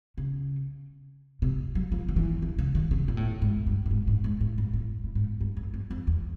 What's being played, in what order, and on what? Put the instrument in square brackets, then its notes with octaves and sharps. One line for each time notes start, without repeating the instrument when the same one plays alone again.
[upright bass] C#3
C3
F#3
F3
D#3
E3
D3
C#3
D#3
C#3
A#2
A2
G#2
G2
A2
G#2
G#2
G#2
A2
G#2
A2
A2
G#2
G2
F#2
G2
F2
E2